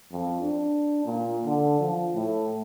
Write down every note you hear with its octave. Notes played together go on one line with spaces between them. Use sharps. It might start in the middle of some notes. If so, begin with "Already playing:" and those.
F2
D4
A#2
D3
F3
A2